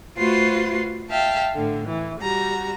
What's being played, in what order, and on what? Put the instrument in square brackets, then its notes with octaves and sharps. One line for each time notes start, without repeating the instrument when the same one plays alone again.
[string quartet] A3 F4 F#4 B4 C5 C6
E5 F5 G5 A5
A2 D3
E3
G3 F#4 A#5